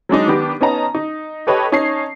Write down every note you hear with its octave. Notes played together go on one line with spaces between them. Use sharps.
F#3 G#3 D4 D#4
D#3 B3 D4 G4 D6
B3 C#4 D#4 D#5 A5 A#5
D#4
G4 A4 B4 C#5 D#5 G5
C#4 D#4 C#5 A5 C7